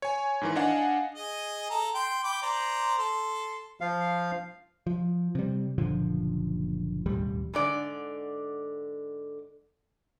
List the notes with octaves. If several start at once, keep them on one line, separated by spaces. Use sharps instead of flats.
C#5 G#5
G#2 D#3 E3
D4 D#5 F5 F#5 G#5
G#4 D#5
A4 A#5
G5 C6
G5 B5 D6
C5 D5 A#5
A4 C6
F3 F5
F3
C3 G3
F#1 A#2 D3 F3
E1 A1 D#2 G3
G#2 D3 D5